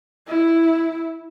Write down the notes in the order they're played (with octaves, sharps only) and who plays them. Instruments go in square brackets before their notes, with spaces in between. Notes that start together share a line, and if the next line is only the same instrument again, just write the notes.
[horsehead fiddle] E4